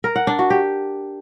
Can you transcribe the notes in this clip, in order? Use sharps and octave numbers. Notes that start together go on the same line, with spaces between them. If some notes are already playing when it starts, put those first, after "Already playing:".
A#4
F#5
D4
F#4
G4